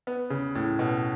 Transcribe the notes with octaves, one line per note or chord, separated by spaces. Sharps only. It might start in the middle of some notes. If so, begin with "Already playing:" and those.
B3
C#3
A2
B2